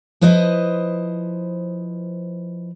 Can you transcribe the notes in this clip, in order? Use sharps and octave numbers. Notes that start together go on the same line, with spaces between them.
F3 E4 B4 C5 D#5